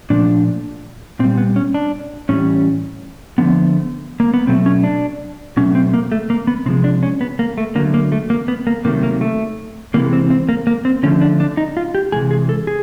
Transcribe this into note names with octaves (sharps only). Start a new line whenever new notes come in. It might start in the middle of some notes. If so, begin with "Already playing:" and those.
A#2 F3 A3 D4
A#2 G3 C4
B3
C#4
D4
A2 E3 G3 C#4
D3 F3 A3 B3
A#3
B3
B2 F#3 A3 C4
C#4
D4
B2 F#3 A3 C#4
C4
A#3
A3
A#3
B3
C3 F3 G#3 C4
D4
C#4
B3
A#3
A3
D3 F#3 A3 A#3
A#3
A3
A#3
B3
A#3
C3 D#3 F#3 A3 A#3
A#3
A3
C3 E3 G#3 A#3
C4
C4
A#3
A#3
C4
D3 F3 A3 C#4
D4
D4
D#4
F4
G4
C3 E3 G#3 G#4
G#4
A4
G#4